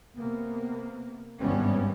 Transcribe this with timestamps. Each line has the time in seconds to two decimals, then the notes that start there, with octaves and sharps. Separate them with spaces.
0.15 C3 A#3 B3
1.39 G#1 G2 E3 G3 B3 C#4